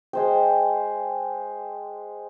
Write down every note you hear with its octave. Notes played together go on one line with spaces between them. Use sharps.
G#3 C5 G5